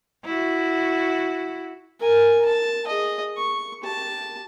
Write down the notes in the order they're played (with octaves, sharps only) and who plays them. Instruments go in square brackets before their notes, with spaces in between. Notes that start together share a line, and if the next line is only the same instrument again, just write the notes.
[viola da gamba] E4 F#4
[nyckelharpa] A#4 G#5
A5
G#4 D#5
C#6
G4 A5